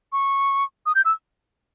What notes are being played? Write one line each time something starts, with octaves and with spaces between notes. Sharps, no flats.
C#6
D#6
G6
E6